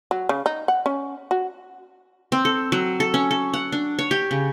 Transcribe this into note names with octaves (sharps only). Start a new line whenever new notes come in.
F#3
C#3
D#4
F#5
C#4
F#4
C4
A4
F#3
A4
C#4
A4
F#5
D4
C#5
G4
C#3